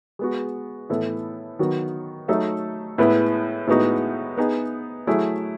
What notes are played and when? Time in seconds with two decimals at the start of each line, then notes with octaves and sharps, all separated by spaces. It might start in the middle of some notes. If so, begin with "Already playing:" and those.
0.19 G#3 B3 F#4
0.90 A2 E3 B3 E4 A4
1.59 D#3 F#3 B3 F#4
2.28 F#3 A3 D#4 A4 E5
2.98 A2 G#3 B3 E4 B4
3.67 A2 G#3 B3 D#4 F#4
4.37 B3 D#4 G#4
5.07 F#3 A3 E4 G#4